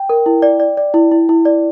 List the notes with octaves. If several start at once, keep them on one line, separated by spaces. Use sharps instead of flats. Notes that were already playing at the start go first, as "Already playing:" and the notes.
Already playing: G5
A#4
E4
D5
D5
D5
E4
E4
E4
D5